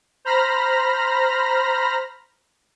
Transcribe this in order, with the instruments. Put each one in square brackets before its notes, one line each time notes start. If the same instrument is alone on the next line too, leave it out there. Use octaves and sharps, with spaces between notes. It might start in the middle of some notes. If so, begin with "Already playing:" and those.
[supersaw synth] C5 A#5 B5 F6 A#6